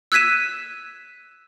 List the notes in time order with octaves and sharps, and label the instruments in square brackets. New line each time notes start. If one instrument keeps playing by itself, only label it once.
[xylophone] E6 F#6 G#6 B6 D#7 E7